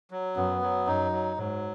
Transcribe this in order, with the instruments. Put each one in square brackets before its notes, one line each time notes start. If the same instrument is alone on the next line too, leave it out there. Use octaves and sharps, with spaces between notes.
[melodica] F#3
[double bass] F#2 [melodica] B3
[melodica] F#3
[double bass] F#2 [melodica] D#4
[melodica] F#3
[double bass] G#2 [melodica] F#3